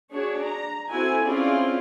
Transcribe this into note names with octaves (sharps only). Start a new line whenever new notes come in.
D4 F#4 G#4 C#5
A#5
C4 E4 F#4 A4 G#5
C4 C#4 E4 F4 G#4 D5